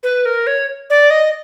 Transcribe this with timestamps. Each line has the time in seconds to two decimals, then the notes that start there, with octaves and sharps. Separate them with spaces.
0.03 B4
0.26 A#4
0.47 C#5
0.90 D5
1.10 D#5